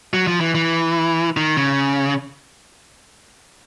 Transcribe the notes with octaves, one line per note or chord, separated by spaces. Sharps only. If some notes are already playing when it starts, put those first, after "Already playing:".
F#3
F3
E3
E3
D#3
C#3